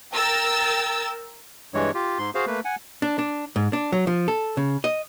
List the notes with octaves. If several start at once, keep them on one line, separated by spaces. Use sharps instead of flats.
A#4 G5 E6 A6
G2 E3 G#3 C#5
F4 G4
G#2 C6
F#4 G#4 C5 F5
A3 A#3 B4
F#5 G#5
D4
D4
G#2
D4
F#3
F3
A4
C#3
D#5